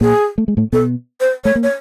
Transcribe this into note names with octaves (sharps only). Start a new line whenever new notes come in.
A#2 A#3 G#4
A3
G#3
A2 A3
B2 B3 A4
C5
A3 C#5
A#3
C#5